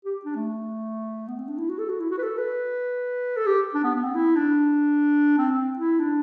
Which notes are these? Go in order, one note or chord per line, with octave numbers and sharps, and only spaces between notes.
G4
D4
A3
B3
C4
D4
E4
F#4
A4
F#4
E4
F#4
B4
A4
B4
A4
G4
D4
B3
B3
C4
E4
D4
C4
C4
E4
D4